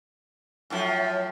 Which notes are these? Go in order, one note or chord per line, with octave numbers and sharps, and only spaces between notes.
F#2 A2 F3